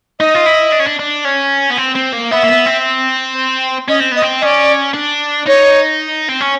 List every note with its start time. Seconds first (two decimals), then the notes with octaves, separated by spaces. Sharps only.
0.20 D#4 D#5
0.35 F4
0.46 E4
0.72 D4
0.80 C#4
0.87 D4
0.99 D4
1.25 C#4
1.71 B3
1.78 C4
1.96 C4
2.13 A#3
2.31 B3 E5
2.44 A#3
2.48 B3
2.66 C4
3.88 C#4 D#5
4.00 C4
4.12 B3 D#5
4.22 C4
4.41 C#4 D5 D#5
4.94 D4
5.47 D#4 C#5
6.29 C4
6.41 C#4